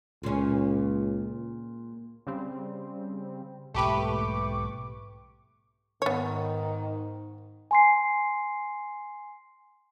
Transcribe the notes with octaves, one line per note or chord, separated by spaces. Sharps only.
C#2 A#2 C#4
C#3 G3 C4
B1 G#2 A3 A#3 G4 B4 C#6 D6
G#2 D#3 B3 C#5
G#5 C6 C7